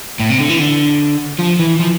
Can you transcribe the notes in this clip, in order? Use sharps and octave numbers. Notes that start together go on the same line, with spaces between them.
A2
C3
D3
E3
D3
F3
E3
F3